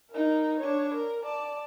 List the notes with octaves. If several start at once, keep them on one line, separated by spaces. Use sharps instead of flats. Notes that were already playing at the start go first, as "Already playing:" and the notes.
D#4 A#4
D4 C#5
A#4
D5 A5